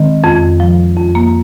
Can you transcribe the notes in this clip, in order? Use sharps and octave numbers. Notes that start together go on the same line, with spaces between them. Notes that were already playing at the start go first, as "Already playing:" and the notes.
Already playing: D#3 G#3 C4
F2
F3
F2
A#3